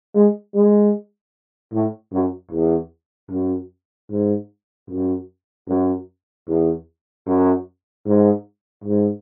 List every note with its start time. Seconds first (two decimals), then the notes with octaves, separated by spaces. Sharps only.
0.15 G#3
0.55 G#3
1.72 A2
2.13 F#2
2.52 E2
3.30 F#2
4.10 G#2
4.89 F#2
5.67 F#2
6.47 E2
7.27 F#2
8.06 G#2
8.84 G#2